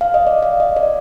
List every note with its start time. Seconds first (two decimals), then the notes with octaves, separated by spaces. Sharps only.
0.01 F5
0.14 D#5
0.27 D5
0.43 F5
0.60 D#5
0.76 D5